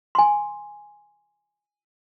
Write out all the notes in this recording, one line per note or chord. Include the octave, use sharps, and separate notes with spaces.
G#5 C6